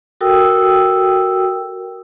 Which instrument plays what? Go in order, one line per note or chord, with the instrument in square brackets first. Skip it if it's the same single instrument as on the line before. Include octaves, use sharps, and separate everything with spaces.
[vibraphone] F#4 A4 A#4 G5 D#6 E6